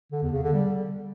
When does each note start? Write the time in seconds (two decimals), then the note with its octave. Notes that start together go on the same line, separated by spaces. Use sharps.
0.12 D3
0.22 E2
0.33 C#3
0.43 D3
0.53 G3